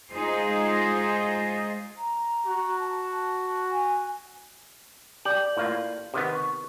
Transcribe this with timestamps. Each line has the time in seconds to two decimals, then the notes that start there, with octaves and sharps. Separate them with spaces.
0.11 G#3 D#4 F4 G#4 C5
1.98 A#5
2.46 F#4
2.80 A5
3.71 G#5
5.25 G4 D5 G6 F#7
5.57 A2 A#3 F4
6.14 C3 D#3 B3
6.35 C#6